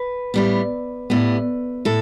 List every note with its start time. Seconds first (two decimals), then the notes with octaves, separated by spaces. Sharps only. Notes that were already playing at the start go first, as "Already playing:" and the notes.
Already playing: B4
0.34 A2 G3 B3
1.10 A2 G3 B3
1.85 A2 A4